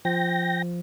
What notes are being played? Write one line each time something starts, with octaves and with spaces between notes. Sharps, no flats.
F3 G5 A#6